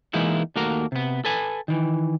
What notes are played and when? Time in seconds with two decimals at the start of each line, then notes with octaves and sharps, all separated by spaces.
0.13 E3 G#3 A#3 B3 D#4 E4
0.56 D#2 A3 A#3 F#4 A#4 A#5
0.92 C3 B3
1.25 A4 B4 G#5
1.68 D#3 E3